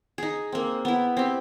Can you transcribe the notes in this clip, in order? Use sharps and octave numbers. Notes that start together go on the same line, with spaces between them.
D#4 G#4
A#3 C4
B3 E4
C4 G4